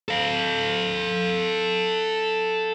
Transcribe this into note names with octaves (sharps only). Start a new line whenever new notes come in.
A4 F5